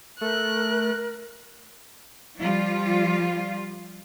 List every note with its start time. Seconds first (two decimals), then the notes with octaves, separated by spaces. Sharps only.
0.21 A3 A#4 F#6
2.40 F3 G3 F4